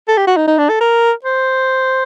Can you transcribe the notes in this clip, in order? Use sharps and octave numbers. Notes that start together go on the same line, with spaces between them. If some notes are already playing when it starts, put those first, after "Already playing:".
A4
G4
F#4
D#4
D#4
D4
A4
A#4
C5